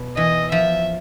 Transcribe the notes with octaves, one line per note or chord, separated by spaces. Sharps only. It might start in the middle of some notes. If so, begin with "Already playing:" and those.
Already playing: B2
E3 D#5
F3 E5